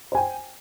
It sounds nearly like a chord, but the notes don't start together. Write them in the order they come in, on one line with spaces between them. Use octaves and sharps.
C5 G#5 G5